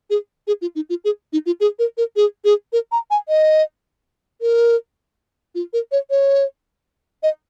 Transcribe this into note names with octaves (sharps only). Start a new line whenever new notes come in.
G#4
G#4
F4
D#4
F4
G#4
D#4
F4
G#4
A#4
A#4
G#4
G#4
A#4
A#5
G#5
D#5
A#4
F4
A#4
C#5
C#5
D#5